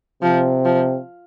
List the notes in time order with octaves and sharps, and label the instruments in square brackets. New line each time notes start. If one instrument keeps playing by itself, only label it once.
[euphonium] C3 [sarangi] F3
[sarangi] F3